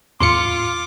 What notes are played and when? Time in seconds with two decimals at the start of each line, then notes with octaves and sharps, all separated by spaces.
0.20 E2 A2 F4 C6 D6 C#7